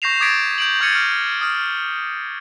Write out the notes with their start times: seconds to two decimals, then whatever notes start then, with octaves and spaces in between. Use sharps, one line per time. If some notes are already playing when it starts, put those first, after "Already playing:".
0.02 C#6 G6 A#6 C7 E7 F7
0.20 D6 D#6 G#6 A6 B6 D7
0.58 G6 D7 F#7
0.80 C#6 F6 G#6 A6 C#7 D#7
0.92 F6 D7
1.41 D#6 F6